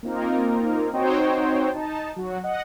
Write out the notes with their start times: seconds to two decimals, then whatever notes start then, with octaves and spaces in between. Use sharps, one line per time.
0.03 A#3 C4 D#4 F4 A#4
0.93 C4 D#4 F#4 C5 C#5 G5
1.72 D#4 A5
2.16 F#3 F#4
2.44 D#5 F#5